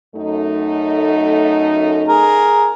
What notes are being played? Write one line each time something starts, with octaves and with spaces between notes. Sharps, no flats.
F#2 A3 D#4
G#4 A#4